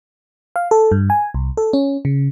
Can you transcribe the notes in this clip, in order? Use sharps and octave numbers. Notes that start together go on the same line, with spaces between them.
F5
A4
G2
G#5
C2
A4
C#4
C#3